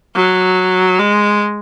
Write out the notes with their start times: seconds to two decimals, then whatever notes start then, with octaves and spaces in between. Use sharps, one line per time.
0.15 F#3
0.99 G#3